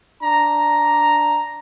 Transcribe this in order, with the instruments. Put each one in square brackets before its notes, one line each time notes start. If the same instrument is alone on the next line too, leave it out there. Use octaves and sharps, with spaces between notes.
[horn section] D4 A#5